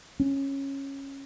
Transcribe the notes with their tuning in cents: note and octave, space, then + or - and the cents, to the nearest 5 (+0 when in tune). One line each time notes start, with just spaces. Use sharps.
C#4 -15